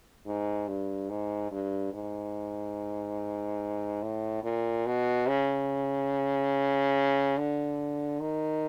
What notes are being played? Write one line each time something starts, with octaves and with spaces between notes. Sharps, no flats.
G#2
G2
G#2
G2
G#2
A2
A#2
B2
C#3
D3
D#3